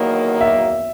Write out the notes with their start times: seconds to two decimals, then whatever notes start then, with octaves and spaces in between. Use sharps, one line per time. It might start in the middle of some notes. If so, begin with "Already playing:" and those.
Already playing: E2 D#3 F#3 A#3
0.41 E5